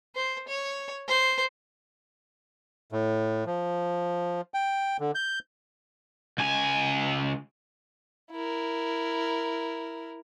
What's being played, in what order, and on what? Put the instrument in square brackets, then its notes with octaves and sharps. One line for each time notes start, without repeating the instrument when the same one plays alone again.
[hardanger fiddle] C5
C#5
C5
[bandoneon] A2
F3
G5
D3
G6
[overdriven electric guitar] C#2 G#5
[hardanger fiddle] E4 A#4